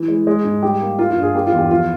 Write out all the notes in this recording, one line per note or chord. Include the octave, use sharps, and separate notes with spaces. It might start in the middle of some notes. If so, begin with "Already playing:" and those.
Already playing: E3
G#3
G#3
G#2
G3 G4
A#3
A#3 F4
F4
G2
G#4
A#3 G4
F4
E2
G4
F3 F4